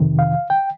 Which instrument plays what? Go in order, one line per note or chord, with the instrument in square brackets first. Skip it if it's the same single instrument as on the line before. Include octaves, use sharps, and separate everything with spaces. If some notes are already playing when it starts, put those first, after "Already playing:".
Already playing: [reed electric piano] F2 C3 D#3
F5
G5